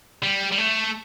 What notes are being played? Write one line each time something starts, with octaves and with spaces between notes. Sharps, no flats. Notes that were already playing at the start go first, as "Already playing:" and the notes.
G3
G3
A3